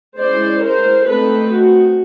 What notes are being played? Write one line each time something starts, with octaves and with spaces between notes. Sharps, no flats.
G#3 C#4 E4 C5 D5
A#4 C5
A3 C4 D#4 A4 B4
F#4